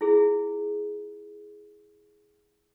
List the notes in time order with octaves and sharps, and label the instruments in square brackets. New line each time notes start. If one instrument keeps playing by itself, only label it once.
[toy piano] E4 F4 G#4